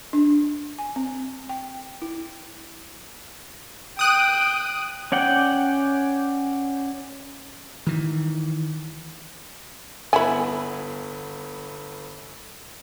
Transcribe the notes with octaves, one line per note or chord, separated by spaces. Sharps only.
D4
G#5
C4
G5
E4
G5 D#6 F#6 D#7
C#4 D5 F#5 G5
D#3 E3
G1 B3 C#4 E4 E5 G#5 B5